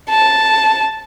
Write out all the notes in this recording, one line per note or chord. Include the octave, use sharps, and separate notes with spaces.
A5